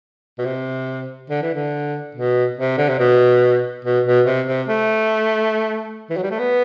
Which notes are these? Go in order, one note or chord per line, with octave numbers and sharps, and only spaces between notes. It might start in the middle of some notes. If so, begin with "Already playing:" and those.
B2
C3
D3
E3
D3
B2
C3
D3
C3
B2
B2
B2
C3
C3
A3
E3
F#3
G3
A3
B3